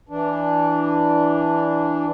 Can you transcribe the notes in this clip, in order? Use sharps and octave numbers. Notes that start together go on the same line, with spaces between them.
E3 D4